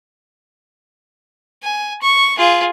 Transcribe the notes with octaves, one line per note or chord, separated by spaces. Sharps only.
G#5
C#6
F4 G#4